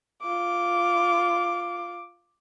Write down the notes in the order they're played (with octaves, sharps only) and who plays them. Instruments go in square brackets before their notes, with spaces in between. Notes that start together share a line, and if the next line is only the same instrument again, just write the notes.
[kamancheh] F4 D6